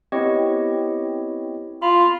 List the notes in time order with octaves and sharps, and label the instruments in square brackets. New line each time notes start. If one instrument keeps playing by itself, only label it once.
[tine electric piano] B3 E4 C#5 [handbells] C4 G4 D#5
[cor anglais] F4 [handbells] B5